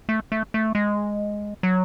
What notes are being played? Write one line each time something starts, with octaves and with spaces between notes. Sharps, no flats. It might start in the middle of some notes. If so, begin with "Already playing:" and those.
A3
A3
A3
G#3
F#3